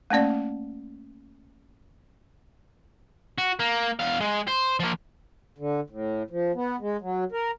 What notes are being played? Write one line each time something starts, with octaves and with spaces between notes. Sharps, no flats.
A3 A#3 C#4 D5
F#4
A#3
E2 F5
G#3
C5
F3 A#3
D3
A2
F3
B3
G#3
F#3
A#4